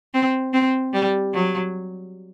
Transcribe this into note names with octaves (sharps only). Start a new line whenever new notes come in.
C4
C4
G3
F#3